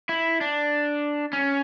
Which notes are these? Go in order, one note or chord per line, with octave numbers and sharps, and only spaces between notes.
E4
D4
C#4